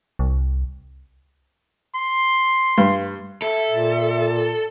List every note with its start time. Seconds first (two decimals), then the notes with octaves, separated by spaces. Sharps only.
0.19 C2
1.95 C6
2.78 G2
3.42 A4 E5
3.69 A#2